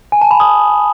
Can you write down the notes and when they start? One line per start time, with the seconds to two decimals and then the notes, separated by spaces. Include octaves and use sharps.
0.12 G#5
0.22 A5
0.31 B5
0.40 D#6